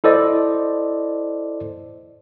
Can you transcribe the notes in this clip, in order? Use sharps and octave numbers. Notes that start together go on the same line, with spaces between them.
E4 A4 C5 D5 D#5